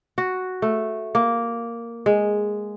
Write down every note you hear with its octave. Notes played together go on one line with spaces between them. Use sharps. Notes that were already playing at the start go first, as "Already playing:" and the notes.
F#4
A3
A#3
G#3